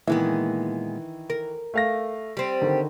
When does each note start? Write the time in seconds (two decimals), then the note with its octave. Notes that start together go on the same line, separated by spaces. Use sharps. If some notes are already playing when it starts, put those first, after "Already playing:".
0.07 A#2 D#3 E3 G#3 B3
1.30 A#4
1.74 A3 F5 A#6
2.37 G3 C4
2.61 D3 D#3